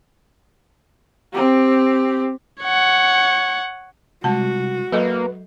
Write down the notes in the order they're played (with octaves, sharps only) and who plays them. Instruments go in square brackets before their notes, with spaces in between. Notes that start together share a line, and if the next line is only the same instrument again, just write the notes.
[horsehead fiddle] C4 G4
[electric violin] C#5 F#5
[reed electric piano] C3 G3 [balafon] G#3 A5 [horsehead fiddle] F#4
[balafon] F#3 A4 D#5 [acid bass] A#3 [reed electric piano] B4